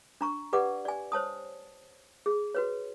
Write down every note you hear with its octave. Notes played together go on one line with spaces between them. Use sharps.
D4 A#5 C#6
G4 B4 D5 F#5 D6
D5 G#5
C5 C#5 A5 D#6
G#4
F#4 B4 C#5